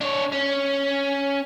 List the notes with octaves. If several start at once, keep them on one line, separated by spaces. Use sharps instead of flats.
D4 C#5
C#4